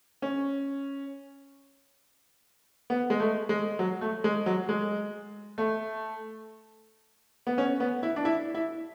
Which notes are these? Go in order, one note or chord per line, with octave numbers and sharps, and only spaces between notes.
C#4
B3
G#3
A3
G#3
F#3
A3
G#3
F#3
G#3
A3
B3
C#4
B3
E4
D4
E4
E4